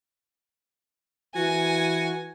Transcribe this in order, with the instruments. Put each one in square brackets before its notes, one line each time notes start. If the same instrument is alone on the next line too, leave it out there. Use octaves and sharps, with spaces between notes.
[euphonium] E3 [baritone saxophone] F#4 [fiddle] G#5